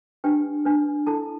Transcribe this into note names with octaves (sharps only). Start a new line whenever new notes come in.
D4 G4 B4 G5
D4 B4
E4 A4 A5